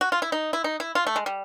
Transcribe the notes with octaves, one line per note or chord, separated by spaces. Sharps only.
F#4
F4
E4
D#4
E4
D#4
E4
F4
A3
G#3
G3